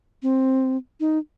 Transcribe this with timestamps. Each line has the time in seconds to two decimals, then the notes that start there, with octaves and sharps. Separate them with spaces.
0.23 C4
1.00 D#4